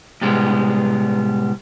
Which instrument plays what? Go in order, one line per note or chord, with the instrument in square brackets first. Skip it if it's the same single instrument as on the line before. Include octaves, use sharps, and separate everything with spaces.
[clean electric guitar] A2 C3 G3 G#3 B3